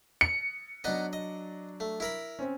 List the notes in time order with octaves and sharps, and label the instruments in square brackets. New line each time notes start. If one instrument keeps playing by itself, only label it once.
[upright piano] C#7
[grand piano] F#3 D4 D5 [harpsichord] B3 D#4 D#5
[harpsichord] D#5
A3
E4 A#4 B5
[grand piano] C4 C#4